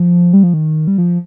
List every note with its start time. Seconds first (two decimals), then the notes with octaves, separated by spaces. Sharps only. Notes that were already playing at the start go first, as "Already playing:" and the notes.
Already playing: F3
0.33 G3
0.43 F3
0.54 D#3
0.88 G3
0.98 F3